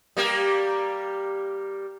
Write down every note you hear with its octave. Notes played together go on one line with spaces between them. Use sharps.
G3 A#3 G4